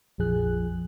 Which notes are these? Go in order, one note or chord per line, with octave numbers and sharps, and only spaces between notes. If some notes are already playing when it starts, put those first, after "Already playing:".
A#1 F2 F3 G#4 F#6